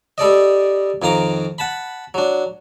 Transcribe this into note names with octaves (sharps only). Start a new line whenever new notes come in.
G3 A4 D5 D#5
F2 D#3 F4 A#5 D6
F#5 A5 B5
F#3 D4